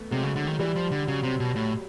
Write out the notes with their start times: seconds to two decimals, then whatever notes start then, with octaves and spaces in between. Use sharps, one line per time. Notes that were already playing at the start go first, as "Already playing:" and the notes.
Already playing: A3 B3
0.11 C3 F#3 G#3
0.23 C#3
0.36 D3
0.47 D#3
0.59 E3 G3
0.76 F3
0.91 D3
1.07 C#3 F#3
1.23 C3
1.40 B2
1.56 A2